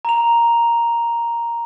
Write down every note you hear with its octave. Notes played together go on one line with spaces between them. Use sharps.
A#5 F7